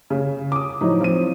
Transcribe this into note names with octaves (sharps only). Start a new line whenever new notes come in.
C#3
D6 D#6
A2 F3 F#3 D#4
F3 C4 D#7